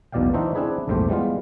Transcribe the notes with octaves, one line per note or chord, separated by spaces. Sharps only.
B1 E2 B2 D5 F5 G5
E3 D4 D#4 F#4 C5 E5
C4 D4 E4 G#4 B4
A#1 E2 G#2 A3 G4 C5
E3 G3 G#3 B3 F4